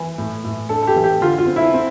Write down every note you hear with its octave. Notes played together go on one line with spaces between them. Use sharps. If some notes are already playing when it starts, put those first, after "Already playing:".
Already playing: E3
A2
A2
D4 A4
A4
G4
E3
G4
D3 F4
F4
C4
E4
C4